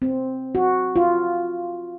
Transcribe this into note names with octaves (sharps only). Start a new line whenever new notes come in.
C4
F#4
F4